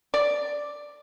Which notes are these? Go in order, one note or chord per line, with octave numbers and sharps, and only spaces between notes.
D5